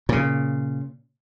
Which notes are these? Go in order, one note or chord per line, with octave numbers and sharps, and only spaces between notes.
A#2 C#3